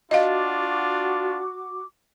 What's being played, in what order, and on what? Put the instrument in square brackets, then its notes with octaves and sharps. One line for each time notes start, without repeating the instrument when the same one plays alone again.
[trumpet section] D4 F4 [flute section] F#4 D6 [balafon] D#5 F5